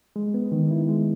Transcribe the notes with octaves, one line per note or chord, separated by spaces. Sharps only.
G#3
B3
D#3
E4
G#3